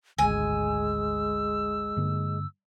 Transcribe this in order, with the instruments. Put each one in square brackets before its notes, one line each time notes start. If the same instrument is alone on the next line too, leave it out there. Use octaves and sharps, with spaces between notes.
[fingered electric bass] G#1 D2 [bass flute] G#3 [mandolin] G#5 [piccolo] E6
[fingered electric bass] G2 D3 A#3